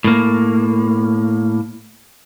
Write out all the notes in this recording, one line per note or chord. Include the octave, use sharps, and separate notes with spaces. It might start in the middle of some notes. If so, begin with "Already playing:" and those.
A2 A#3